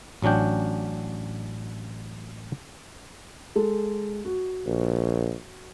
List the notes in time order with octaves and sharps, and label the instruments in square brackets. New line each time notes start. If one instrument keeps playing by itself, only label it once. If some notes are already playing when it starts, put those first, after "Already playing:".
[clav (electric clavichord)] A1 F#3 C#4 D4 G5
[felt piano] G#3 A4
F#4
[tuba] A#1